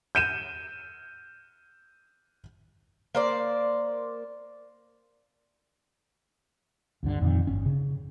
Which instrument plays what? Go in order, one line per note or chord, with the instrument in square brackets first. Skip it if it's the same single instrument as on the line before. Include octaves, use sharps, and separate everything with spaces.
[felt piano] G6 D#7 E7
[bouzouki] A#3 C5 D5
[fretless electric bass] C#2 G2 D3
F2 A#2 D3 D#3
G1 C#4
C#3